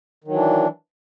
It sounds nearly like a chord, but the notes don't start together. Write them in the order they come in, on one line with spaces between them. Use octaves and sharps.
D#3 F#3 E3 D4